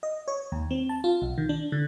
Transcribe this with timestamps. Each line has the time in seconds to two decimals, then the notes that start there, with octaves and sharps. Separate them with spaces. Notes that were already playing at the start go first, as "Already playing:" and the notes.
0.03 D#5
0.28 C#5
0.52 D#2
0.71 C4
0.89 A5
1.04 F4
1.22 B1
1.38 D#3
1.49 D4
1.72 D3